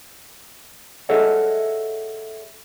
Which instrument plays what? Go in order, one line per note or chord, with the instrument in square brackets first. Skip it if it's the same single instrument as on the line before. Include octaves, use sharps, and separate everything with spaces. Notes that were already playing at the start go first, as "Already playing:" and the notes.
[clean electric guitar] G#4 A4 C#5 D#5 E5 F#5